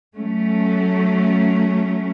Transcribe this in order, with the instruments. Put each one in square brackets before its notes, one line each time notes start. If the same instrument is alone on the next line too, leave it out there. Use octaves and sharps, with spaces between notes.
[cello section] F#3 A3 C#4